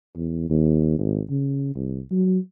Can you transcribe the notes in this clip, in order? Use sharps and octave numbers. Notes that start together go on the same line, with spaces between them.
E2
D#2
G#1
C#3
C2
F#3